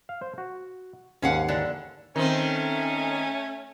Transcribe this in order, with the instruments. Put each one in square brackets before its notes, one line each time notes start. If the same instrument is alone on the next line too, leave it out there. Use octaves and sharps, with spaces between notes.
[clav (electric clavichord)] F5
C5
F#4
[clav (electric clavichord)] D#2 G#2 [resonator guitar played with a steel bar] C#4 F5 F#5
[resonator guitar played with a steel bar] D3 E3 D4
[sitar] D#3 C4 [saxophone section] A3 C#4